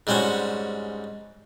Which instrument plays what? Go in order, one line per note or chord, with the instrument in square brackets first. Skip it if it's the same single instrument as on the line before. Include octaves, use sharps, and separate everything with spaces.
[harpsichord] G#2 G3 C4 C#4 F#4